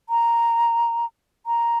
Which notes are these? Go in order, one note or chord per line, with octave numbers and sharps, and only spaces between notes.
A#5
A#5